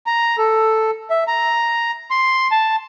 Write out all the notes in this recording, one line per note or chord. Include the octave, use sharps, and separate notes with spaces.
A#5
A4
E5
A#5
C6
A5